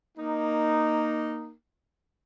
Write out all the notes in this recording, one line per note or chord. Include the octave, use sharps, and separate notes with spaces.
A#3 D#4